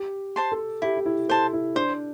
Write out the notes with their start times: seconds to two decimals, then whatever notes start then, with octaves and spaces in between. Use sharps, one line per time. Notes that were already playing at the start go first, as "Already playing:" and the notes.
Already playing: G4
0.36 C5 A5 C6
0.52 A4
0.82 E4 G4
0.97 G4
1.06 E4
1.29 A4 C5 A5 C6
1.53 E4
1.76 D4 C5